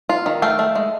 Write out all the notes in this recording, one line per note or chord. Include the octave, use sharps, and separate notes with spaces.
F4
D#3
A3 F5 G5
A3
G#3